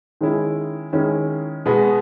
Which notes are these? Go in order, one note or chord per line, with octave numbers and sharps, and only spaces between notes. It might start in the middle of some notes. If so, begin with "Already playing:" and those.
D#3 G#3 C#4 E4
D#3 G#3 C#4 E4
B2 G#3 B3